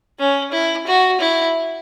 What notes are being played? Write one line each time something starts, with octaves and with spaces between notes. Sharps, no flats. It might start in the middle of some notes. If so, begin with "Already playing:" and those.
C#4
E4
F#4
E4